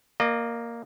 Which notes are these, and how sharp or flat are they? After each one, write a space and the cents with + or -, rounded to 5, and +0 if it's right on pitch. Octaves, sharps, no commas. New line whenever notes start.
A#3 +0 D#5 -35